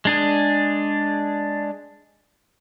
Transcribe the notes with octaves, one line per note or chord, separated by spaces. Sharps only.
G#3 D4 G#4